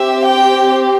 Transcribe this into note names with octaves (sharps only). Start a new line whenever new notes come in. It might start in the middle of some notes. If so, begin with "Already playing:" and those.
Already playing: C4 G4 E5
G5